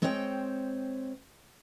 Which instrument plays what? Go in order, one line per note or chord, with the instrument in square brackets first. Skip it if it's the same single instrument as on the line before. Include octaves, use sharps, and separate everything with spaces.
[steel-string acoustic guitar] G#3 C4 C5 C#5 E5 G5